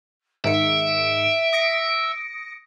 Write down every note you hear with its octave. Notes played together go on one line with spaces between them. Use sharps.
G#2 D#3 E5 C#7 D7
D#6 A#6 C#7